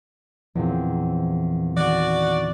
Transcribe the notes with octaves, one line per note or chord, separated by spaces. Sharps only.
E2 A#2 F3 C4
D#3 F#4 D5